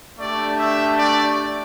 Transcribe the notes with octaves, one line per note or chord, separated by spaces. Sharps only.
A3 D4 G4 D5
E5
D5